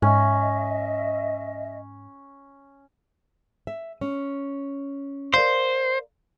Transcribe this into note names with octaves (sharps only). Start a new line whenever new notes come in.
G#2 C#4 D#5 E5
E5
C#4
A#4 C5 D5 F5